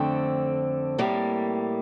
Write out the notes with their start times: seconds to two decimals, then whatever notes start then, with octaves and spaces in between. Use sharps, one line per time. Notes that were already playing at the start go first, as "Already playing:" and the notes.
Already playing: F2 D3 A3 C4
0.98 A2 G3 A#3